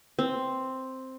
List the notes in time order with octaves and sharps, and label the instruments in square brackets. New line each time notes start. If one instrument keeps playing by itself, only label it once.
[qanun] C4